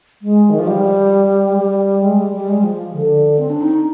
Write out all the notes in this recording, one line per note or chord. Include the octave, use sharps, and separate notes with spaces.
G#3
D#3
F3
G3
G3
G#3
G3
G3
G#3
F3
D3
C4
D4
D#4